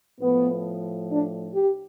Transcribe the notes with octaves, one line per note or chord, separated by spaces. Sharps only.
A2 F3 B3
D4
G4